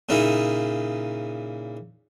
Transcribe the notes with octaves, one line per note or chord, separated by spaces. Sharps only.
A#2 C#3 D#4 E4